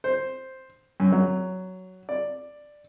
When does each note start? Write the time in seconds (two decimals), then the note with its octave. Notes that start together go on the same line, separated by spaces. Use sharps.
0.04 C5
1.00 F#2
1.12 F#3
2.09 D5